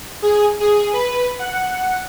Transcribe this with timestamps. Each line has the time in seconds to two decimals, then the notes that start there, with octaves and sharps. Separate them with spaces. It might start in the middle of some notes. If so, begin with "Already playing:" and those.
0.22 G#4
0.60 G#4
0.93 B4
1.39 F#5